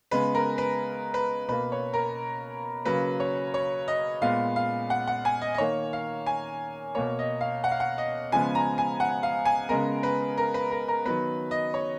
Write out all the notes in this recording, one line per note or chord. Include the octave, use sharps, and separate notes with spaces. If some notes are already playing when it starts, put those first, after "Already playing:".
C#3 G#3 B3 B4
A#4
B4
B4
B2 A#3 B4
C#5
A#4
C#3 F#3 A#3 B4
C#5
C#5
D#5
A#2 G#3 B3 F5
F5
F#5
F#5
G#5
D#5
D#5
D#3 A#3 C#5
F5
G#5
B2 A#3 C#5
D#5
F5
F#5
F5
F#5
D#5
C#3 F3 G#3 B3 G#5
A#5
G#5
F#5
F5
G#5
C#3 G#3 B3 A#4
B4
A#4
B4
A#4
A#4
D#3 F#3 B3 B4
D#5
C#5